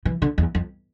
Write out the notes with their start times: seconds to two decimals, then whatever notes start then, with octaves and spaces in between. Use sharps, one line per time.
0.05 E3
0.22 D3
0.38 E2
0.55 F2